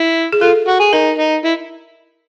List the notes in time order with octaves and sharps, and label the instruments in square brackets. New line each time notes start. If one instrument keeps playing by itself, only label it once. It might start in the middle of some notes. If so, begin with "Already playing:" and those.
Already playing: [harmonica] E4
[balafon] G#4
[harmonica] F4 [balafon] A4
[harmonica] F#4
G#4
[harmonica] D#4 [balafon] A#4
[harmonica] D#4
E4